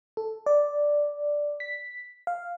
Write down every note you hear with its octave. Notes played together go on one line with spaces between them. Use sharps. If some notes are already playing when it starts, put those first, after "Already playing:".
A4
D5
B6
F5